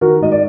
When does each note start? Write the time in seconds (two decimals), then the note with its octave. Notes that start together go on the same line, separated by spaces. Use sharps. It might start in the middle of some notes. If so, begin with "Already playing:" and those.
0.01 D#3 F#4 A#4
0.21 G#2 D#5
0.31 D5